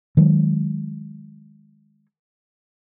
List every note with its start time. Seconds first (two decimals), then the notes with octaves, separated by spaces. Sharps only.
0.17 D#3 F#3 G#3